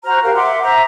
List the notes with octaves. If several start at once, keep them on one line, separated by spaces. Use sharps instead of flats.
F#4 C5 A#5 F6
G4 A#4 F5
E5 F#5 C6 D6
C5 E5 A#5